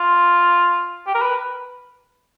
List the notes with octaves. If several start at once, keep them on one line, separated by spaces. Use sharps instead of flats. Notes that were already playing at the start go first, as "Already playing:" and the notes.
Already playing: F4
G4
A#4
B4